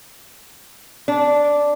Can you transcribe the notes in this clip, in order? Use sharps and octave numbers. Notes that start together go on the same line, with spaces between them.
D4